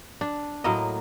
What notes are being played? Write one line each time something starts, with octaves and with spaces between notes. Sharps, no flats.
D4
A2 F#3 A#3 D#5